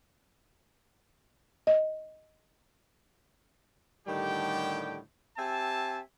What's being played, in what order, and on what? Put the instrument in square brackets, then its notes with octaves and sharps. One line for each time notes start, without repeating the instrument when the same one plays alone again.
[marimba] D#5
[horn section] A2 D3 D#3 G3 G4 G5
C4 G4 E5 G#5 A5